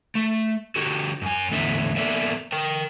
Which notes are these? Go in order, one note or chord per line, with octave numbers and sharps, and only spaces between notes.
A3
D3 F#4 G4
F#2 G#5
E2 A2 D3 B3 E5
A#3 B3 A4 A#4 D5 E5
A#4 G5